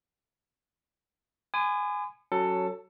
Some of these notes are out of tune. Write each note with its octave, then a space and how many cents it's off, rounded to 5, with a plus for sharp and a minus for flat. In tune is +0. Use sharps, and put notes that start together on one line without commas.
G#5 +0 B5 +45 D#6 -45
F#3 +5 C#4 +0 A4 +15